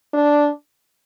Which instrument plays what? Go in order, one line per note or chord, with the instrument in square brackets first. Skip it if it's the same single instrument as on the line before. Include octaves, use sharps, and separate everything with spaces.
[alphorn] D4